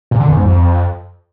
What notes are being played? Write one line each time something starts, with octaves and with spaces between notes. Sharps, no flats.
A#2
D3
E2
G#2
F2